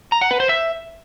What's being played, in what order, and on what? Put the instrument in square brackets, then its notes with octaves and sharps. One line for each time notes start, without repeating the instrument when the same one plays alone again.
[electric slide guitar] A#5
F#5
B4
C5
E5